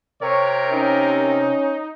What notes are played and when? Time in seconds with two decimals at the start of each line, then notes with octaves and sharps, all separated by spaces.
0.21 C3 A#4 C#5
0.72 C#4 D#4